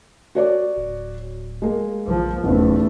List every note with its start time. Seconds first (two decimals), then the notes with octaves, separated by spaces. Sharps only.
0.35 F#4 C#5 D5
0.76 D1
1.62 G#3 A#3
2.07 A#1 F3
2.44 F1 B1 E2 C#3 A3 B3